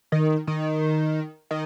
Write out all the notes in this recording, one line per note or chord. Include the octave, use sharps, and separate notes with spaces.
D#3
D#3
D#3